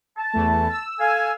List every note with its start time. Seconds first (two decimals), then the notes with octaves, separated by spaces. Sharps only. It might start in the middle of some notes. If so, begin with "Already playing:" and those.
0.18 A5
0.33 E2 E3 A3
0.70 E6
1.00 A4 F5 G#5